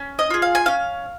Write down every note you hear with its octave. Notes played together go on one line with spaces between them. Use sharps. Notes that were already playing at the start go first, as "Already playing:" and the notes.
Already playing: C#4
D#5
F4 G#4
F5
G#5
C#4 F5